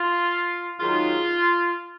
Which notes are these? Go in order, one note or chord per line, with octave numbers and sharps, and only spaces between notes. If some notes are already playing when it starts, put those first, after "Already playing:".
Already playing: F4
G#2 D#3 F#3 F4